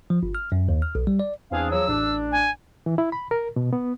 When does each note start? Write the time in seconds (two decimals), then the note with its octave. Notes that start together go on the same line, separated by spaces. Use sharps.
0.10 F3
0.23 G1
0.35 F6
0.52 F#2
0.69 D#2
0.82 F6
0.95 B1
1.07 G3
1.20 D5
1.51 E2 C4 D4 G#4 F5
1.71 F3 F#3 E6
1.88 A1 D4
2.32 G#5
2.86 E3
2.98 E4
3.12 B5
3.31 A#4
3.56 B2
3.73 B3